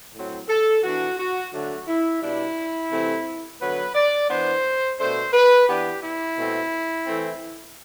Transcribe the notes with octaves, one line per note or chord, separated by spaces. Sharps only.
A2 F#3 C4
A4
E3 B3 D4 F#4
F#4
D3 F#3 A3 D4 F#4
E4
B2 G3 D4 E4
C3 E3 A3 C4
D3 F#3 B3 B4
D5
E3 B3 D4 C5
B2 A3 D4 C5
B4
E3 B3 D4 G4
E4
B2 A3 C4
E3 A3 C4